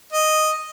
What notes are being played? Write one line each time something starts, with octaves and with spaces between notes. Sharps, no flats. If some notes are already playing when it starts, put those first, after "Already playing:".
D#5